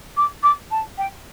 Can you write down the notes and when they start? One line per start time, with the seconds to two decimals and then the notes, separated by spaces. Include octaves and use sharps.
0.17 D6
0.43 D6
0.71 A5
0.98 G5